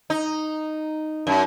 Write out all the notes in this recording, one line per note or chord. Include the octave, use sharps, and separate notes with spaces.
D#4
F#2